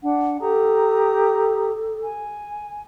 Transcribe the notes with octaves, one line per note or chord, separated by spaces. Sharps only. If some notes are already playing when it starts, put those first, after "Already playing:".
D4 F#5
G4 A4 A#5 D#6
G#5